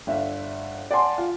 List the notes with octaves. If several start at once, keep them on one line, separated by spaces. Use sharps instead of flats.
G1 D4 E5 F5
D5 F#5 G#5 A5 C6
F4